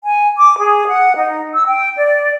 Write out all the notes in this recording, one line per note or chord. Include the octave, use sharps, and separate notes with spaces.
G#5
D6
G#4
F#5
D#4
E6
G5
D5